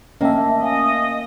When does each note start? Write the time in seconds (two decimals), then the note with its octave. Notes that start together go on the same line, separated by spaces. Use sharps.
0.21 A#3 C#4 D#5 E5 G5 A5
0.63 D#5 F5 G#5